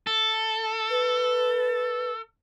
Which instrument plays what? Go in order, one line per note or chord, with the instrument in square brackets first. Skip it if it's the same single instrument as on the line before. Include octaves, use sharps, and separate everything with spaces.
[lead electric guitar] A4
[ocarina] B4